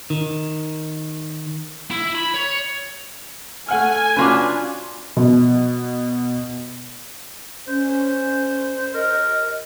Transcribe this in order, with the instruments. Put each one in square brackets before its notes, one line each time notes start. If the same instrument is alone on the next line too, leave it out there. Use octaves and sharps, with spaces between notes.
[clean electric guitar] D#3
[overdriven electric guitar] E4
B5
C#5
[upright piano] A3 F#5 F6 [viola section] G#5
[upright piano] C#4 F#4 [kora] D4 F4 B4
[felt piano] B2
[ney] C#4 [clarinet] C5
[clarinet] A#4 [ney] D#5